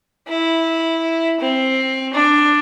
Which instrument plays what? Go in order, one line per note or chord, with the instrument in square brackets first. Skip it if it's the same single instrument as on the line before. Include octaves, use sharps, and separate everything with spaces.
[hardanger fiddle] E4
C4
D4